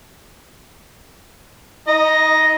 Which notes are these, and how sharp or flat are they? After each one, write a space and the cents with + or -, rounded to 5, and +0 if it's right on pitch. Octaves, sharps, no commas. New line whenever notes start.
D#4 +30 D#5 +0 A#5 +0